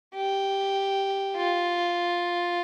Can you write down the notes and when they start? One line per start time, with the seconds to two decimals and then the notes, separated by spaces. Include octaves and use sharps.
0.16 G4
1.36 F4